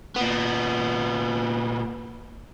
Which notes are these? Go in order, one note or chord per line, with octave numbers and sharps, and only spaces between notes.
A#2 B3